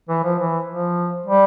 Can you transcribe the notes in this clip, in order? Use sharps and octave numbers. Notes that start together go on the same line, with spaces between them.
E3
F3
E3
F3
G3